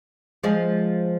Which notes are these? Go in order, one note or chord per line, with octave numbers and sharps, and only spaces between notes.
F3 G#3